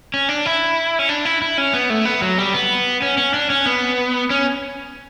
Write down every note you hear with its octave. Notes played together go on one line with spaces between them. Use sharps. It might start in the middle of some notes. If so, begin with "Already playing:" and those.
C#4
D4
E4
C#4
D4
E4
E4
C#4
B3
A3
B3
F#3
G3
B3
C#4
C#4
D4
C#4
B3
C#4